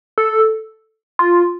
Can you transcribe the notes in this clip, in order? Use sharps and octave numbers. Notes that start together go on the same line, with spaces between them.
A4
F4